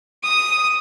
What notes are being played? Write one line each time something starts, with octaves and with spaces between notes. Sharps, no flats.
D#6